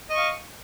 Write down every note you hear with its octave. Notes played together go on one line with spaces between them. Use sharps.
D#5 F5 C#6